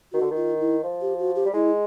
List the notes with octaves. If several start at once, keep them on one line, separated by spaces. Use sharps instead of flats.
D#3 F#4
D3
D#3
F4
E4
F3
G4
F#4
G4
G3
G#3 E4